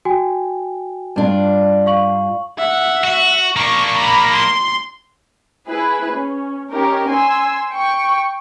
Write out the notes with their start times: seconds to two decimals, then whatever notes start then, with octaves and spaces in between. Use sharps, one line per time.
0.05 F#4 G5 G#5
1.16 G2 D4 F4
1.86 F5 C#6 F#7
2.58 E5 F#5
3.04 F#4
3.56 A#3 D4 C#6
3.97 A#5 B5
4.34 C6
5.68 E4 G#4 B4
6.14 C#4
6.72 C#4 D#4 G4 A#4
7.10 G#5 C6 E6
7.72 G5 C#6